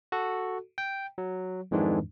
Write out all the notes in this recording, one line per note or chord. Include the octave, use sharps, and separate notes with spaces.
F#4 A4
G5
F#3
F2 G#2 D#3 E3 G#3 D4